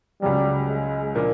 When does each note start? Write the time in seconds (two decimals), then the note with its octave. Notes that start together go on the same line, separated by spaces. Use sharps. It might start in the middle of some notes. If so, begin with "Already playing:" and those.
0.22 C#2 C#3 F#3 G3
0.68 G#3
1.15 A#2 F3 A#3 D4